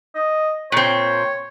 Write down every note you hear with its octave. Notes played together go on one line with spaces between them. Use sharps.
D#5
A#2 C4 C#5